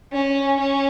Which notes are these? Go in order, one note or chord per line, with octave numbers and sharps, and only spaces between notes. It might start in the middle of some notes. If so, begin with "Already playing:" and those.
C#4
C#4